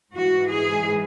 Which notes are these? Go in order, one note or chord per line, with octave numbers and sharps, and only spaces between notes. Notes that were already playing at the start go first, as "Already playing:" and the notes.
G#2 E3 G#3 F#4
G#4